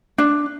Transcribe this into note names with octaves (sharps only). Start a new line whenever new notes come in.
D4